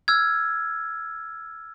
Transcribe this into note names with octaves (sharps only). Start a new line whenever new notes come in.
E6 F6 G#6